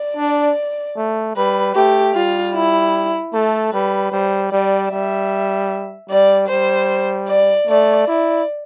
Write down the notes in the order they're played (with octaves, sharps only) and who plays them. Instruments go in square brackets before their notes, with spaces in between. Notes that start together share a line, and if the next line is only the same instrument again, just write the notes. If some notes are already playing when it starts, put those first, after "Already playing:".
Already playing: [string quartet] D5
[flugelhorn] D4
A3
[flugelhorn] G3 [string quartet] B4
[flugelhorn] A3 [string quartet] G4
[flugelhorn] G3 [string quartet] F4
[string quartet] E4
[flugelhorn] A3 [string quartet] A4
[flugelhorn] G3 [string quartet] B4
[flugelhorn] G3 [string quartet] C5
[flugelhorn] G3 [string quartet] D5
[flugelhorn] G3 [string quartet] E5
[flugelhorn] G3 [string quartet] D5
[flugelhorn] G3 [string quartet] C5
[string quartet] D5
[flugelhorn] A3 [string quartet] D5
[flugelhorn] E4 [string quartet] D5